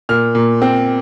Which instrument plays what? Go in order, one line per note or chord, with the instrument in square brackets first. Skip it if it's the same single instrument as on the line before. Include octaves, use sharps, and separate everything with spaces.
[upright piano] A#2 F6
A#2
C4